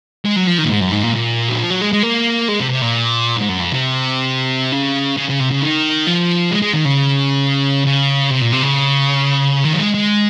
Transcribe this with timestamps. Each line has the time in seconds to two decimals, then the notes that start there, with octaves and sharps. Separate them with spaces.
0.25 G#3
0.36 F#3
0.47 F3
0.58 D#3
0.65 A#2
0.69 G#2
0.80 F#2
0.92 G#2
1.03 A#2
1.14 A#2
1.49 F#3
1.59 F3
1.70 F#3
1.81 G#3
1.93 G#3
2.03 A#3
2.49 G#3
2.60 C3
2.71 C3
2.82 A#2
3.37 G#2
3.49 F#2
3.60 F2
3.72 C3
4.73 C#3
5.17 C#3
5.29 C#3
5.40 C3
5.51 C#3
5.62 D#3
6.07 F3
6.51 G#3
6.62 G#3
6.74 D#3
6.85 C#3
7.86 C#3
8.31 C3
8.42 A#2
8.53 C3
8.63 C#3
9.65 D#3
9.73 F#3
9.79 G#3
9.95 G#3